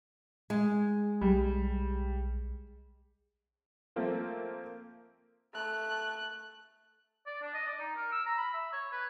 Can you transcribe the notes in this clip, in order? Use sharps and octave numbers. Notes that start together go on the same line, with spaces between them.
G#3
B1 G3
F3 A3 A#3 C4 F4
A3 F#6
D5
D4
D#5
D5
D#4
A#4
E6
A#5
B5
E5
C#5
B4